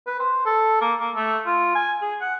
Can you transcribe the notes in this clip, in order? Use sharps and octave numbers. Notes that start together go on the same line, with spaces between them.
B4
C5
A4
A#3
A#3
A3
F4
G#5
G#4
F#5